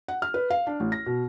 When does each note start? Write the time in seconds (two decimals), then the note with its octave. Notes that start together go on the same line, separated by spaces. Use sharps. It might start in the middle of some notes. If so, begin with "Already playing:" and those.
0.08 F#5
0.22 F6
0.34 B4
0.50 F5
0.67 D4
0.80 A1
0.92 A#6
1.06 B2